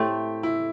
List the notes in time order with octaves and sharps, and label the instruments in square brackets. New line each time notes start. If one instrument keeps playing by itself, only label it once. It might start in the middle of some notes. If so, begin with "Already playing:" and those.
Already playing: [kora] A2 A3 C4 A4 [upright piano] G4
[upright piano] E4